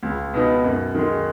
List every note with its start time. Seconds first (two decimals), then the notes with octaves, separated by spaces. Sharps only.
0.03 C#2
0.34 B2 B3 D#4
0.64 F#2
0.95 D#3 G#3